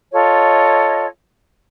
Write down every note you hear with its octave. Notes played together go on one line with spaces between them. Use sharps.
F4 A4 C#5 D#5